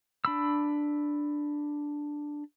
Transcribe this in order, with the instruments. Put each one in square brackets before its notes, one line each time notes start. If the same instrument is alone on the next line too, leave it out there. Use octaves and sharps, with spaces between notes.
[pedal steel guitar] D4 B5 E6